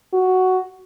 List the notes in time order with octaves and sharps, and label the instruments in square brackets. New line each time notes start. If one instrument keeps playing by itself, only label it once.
[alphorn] F#4